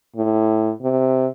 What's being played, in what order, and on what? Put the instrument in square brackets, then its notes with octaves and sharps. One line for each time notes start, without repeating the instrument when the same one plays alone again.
[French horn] A2
C3